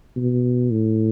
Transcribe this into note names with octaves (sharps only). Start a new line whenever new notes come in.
B2
A2